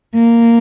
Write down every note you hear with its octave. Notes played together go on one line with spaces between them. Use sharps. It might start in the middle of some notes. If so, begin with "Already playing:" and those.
A#3